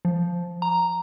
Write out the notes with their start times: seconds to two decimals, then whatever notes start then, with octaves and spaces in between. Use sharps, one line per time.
0.05 F3
0.62 A#5